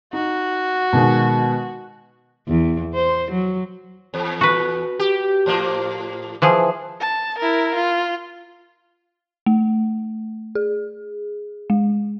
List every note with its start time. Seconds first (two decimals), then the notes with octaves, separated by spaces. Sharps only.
0.13 D#4 F#4
0.93 B2 D#3 G#3
2.48 E2
2.95 C5
3.32 F#3
4.14 E2
4.41 F#4 B4
4.99 G4
5.46 A2 F3 A#3
6.42 E3 F3 G#4
7.00 A5
7.39 E4 A#4
7.75 F4
9.46 A3
10.55 G#4
11.70 G#3